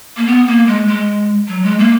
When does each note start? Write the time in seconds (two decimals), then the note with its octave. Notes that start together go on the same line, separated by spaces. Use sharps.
0.17 A#3
0.26 B3
0.47 A#3
0.67 G#3
0.87 G#3
1.48 F#3
1.63 G#3
1.79 A#3